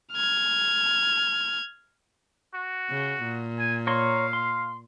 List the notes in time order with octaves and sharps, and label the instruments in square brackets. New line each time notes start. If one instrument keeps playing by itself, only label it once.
[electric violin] F6 G#6
[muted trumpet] F#4
[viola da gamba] C#3
A#2
[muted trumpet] G#5
[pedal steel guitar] C#5 A#5 C6 [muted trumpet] F5
[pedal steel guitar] C6